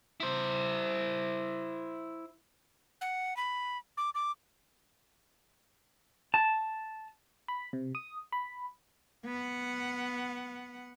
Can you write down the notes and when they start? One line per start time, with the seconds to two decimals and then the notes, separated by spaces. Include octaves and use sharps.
0.20 E4 C5
3.01 F#5
3.37 B5
3.97 D6
4.15 D6
6.34 A5
7.48 B5
7.73 C3
7.95 D#6
8.32 B5
9.25 B3 F#5